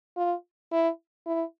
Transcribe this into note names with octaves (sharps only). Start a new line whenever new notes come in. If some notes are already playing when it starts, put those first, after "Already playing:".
F4
E4
E4